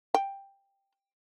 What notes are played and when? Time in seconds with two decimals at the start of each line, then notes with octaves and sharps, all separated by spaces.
0.14 G5